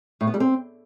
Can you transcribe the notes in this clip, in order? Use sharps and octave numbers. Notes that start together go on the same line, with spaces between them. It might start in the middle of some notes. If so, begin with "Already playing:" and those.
A2
B3
G3
C4